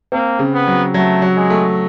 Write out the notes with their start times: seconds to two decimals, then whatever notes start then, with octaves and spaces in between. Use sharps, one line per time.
0.12 A#3 C4
0.39 C#3
0.54 B3
0.67 F#3
0.94 F#3 A3
1.22 F#3
1.37 G#3
1.50 A3